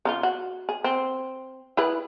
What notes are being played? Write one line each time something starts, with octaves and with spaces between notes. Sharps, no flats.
C#3 D#4 F4
F#4
G#4
C4
E4 G#4 B4